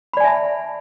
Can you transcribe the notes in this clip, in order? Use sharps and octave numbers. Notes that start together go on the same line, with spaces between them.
D5 E5 G#5 A5 B5